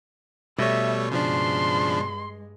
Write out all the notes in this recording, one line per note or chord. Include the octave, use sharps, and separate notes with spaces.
B2 G3 A3 C#5 E5
G2 C#3 F3 G#3 D4 C6